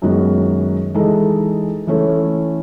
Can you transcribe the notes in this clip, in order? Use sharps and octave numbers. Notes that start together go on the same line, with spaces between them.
F#2 D#3 G#3 B3 F#4
E3 G#3 D#4 A4
E3 A3 C#4 E4 A4